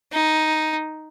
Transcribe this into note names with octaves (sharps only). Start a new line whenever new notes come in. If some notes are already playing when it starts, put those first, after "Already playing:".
D#4